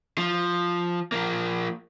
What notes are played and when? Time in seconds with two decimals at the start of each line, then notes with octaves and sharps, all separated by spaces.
0.18 F3
1.12 F3 A#3